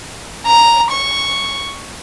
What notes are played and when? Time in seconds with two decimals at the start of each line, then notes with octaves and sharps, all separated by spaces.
0.47 A#5
0.91 C#6